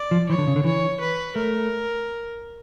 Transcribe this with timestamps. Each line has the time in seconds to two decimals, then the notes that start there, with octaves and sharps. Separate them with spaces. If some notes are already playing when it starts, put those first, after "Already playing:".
Already playing: D5
0.11 F3
0.29 E3 C#5
0.38 D3
0.47 C#3
0.56 D3
0.64 E3 C#5
1.00 B4
1.36 A3 A#4